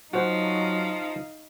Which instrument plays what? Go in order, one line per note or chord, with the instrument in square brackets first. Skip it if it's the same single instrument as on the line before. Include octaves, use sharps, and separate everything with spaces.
[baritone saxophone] F3 [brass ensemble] F#3 [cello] D#4 F5 [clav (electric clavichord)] F#4 C5 F#5